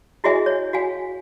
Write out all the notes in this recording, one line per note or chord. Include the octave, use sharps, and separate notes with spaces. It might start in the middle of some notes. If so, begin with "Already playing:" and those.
E4 F#4 G#4 D#5 E5 G#5
C#5
F#4 F5 G#5